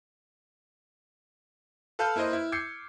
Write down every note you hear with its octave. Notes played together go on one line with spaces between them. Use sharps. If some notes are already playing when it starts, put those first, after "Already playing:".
A4 B4 F5 A5 F6 G6
A#3 E4 B4 C5 D#5
E4
D6 E6 G6 G#6 C7 C#7